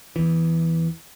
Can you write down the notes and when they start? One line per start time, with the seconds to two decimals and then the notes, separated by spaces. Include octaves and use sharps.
0.16 E2 E3